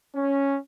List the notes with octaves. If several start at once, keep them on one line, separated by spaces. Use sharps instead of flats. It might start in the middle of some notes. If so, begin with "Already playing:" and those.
C#4